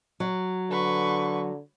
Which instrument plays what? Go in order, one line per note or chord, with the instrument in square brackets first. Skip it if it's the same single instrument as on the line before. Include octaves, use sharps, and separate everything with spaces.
[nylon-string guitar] F#3
[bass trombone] D3 [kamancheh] B4 C#6